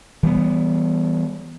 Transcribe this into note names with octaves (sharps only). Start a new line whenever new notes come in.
E3 G3 B3